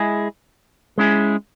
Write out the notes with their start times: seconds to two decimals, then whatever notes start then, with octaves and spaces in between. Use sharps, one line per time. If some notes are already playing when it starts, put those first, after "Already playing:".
Already playing: G#3 E4 G#4
0.98 G#3 C#4 E4 G#4